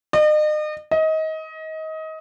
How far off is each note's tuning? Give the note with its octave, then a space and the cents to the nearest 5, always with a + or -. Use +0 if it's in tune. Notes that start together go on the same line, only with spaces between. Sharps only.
D#5 -40
D#5 +25